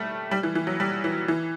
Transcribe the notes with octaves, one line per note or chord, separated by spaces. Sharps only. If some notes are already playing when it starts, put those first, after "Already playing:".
Already playing: G3 A3
G3
E3
E3
F#3
G3
E3
E3